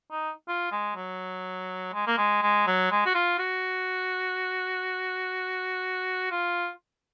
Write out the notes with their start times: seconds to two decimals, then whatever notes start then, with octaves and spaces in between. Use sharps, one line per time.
0.11 D#4
0.48 F4
0.71 G#3
0.96 F#3
1.93 G#3
2.07 A#3
2.18 G#3
2.42 G#3
2.67 F#3
2.91 G#3
3.06 F#4
3.14 F4
3.39 F#4
6.31 F4